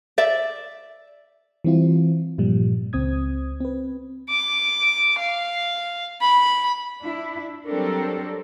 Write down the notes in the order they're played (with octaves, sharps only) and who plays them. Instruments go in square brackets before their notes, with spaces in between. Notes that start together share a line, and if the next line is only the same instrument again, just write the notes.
[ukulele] D5 E5
[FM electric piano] E3 G3 C4 E4 F4
G2 A#2 F3 G3
C#2 C4 D#6 G#6
C4 B4
[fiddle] D6
F5
B5
[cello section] D4 E4
F#3 G3 C4 D4 A4 A#4